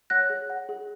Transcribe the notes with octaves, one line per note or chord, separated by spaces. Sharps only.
C#5 F#5 F#6 A#6
G#4
F#5
G#4